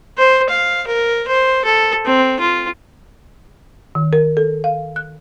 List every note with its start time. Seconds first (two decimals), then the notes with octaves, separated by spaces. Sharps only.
0.17 C5
0.49 F5
0.87 A#4
1.28 C5
1.65 A4
2.05 C4
2.40 F4
3.95 D#3
4.13 A#4
4.37 A4
4.64 F5
4.96 F#6